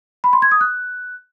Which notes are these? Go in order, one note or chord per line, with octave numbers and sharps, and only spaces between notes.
B5
C6
G#6
D#6
F#6